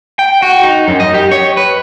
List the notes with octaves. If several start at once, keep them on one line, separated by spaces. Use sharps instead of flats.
G5
F#4
D#4
F#2
D#5
G4
C#5
B4